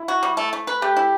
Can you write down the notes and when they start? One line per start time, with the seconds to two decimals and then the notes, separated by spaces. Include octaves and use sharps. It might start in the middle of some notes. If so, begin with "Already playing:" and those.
Already playing: E4
0.08 F#4
0.23 G3
0.37 A3
0.53 A3
0.67 B4
0.82 A3 G4
0.97 E4